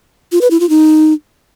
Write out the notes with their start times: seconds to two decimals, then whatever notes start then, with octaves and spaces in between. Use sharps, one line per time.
0.32 F4
0.41 B4
0.51 E4
0.60 F4
0.69 D#4